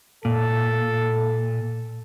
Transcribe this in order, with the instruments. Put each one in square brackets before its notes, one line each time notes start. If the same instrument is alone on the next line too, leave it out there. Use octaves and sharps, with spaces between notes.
[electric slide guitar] A#2 [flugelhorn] A4